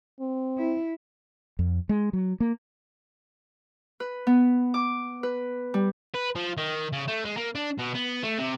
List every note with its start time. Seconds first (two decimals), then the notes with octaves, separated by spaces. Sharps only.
0.20 C4
0.58 E4
1.59 F2
1.89 G#3
2.13 F#3
2.40 A#3
4.00 B4
4.27 B3
4.74 D6
5.23 B4
5.74 G3
6.15 B4
6.36 F3
6.57 D#3
6.92 C#3
7.08 A3
7.25 G#3
7.37 A#3
7.55 D4
7.78 B2
7.94 B3
8.23 A3
8.38 C3